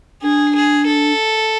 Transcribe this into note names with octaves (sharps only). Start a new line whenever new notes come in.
D4 G#4
G#4
A4